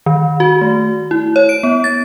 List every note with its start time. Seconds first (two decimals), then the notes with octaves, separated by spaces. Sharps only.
0.06 D#3
0.40 F#4
0.61 A3
1.11 E4
1.36 C#5
1.49 D7
1.63 B3
1.84 A6